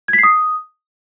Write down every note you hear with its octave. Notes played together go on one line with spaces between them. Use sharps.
G#6
B6
C7
D#6